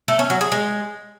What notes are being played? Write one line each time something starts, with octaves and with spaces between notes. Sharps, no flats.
A3
C#4
F#3
G#4
G#3